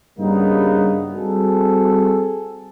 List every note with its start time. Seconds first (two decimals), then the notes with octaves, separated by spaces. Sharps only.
0.19 G2 C#3 G3 A#3 B3 D#4
1.16 G3 C4 F#4 G#4 A4